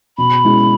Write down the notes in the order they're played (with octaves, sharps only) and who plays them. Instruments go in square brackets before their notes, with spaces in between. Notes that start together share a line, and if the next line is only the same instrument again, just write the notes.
[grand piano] B2 [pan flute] B5
[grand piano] G#3 C#4 E4